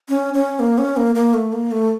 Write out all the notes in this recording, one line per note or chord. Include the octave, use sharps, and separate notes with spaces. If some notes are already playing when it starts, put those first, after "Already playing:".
C#4
C#4
A#3
C#4
A#3
A#3
A3
A#3
A3